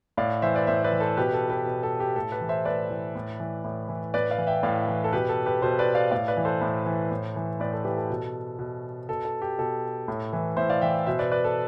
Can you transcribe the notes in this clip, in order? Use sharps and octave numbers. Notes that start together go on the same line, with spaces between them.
A2 D5 F5
E3 C5 E5
B4 D5
A2 C5 E5
B4 D5
E3
A4 C5
B2 G4 B4
A4
G4 B4
B2
A4
G4
A2 A4
G4 B4
E3
C5 E5
A2 B4 D5
E3
A2
E3
A2
E3
A2 B4 D5
D5 F5
E3
E5 G5
A2 D5 F5
E3
A4
B2 G4 B4
A4
G4 B4
B2 A4 C5
B4 D5
D5 F5
A2 D5 F5
B4 D5
E3
A4 C5
A2
E3
A2
E3
A2 B4 D5
A4
E3 G4 B4
A4
B2
B2
B2 A4
A4
G4
B2 A4
A2
E3
A2 C5 E5
D5 F5
E3 E5 G5
B2 C5 E5
B4 D5
B4 D5
A4